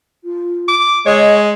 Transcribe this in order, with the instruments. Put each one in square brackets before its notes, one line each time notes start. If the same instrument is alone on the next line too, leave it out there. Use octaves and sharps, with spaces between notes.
[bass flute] F4
[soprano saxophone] D6
[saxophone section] G#3 [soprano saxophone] C#5 [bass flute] D#5